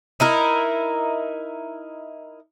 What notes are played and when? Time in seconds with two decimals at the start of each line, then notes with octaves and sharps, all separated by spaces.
0.20 D#4 E4 A#4